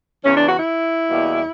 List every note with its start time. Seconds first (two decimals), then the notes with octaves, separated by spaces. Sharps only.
0.23 E2 C#3 E3 C#4
0.34 D4
0.46 F#4
0.56 E4
1.10 E2 B2 G3 A#3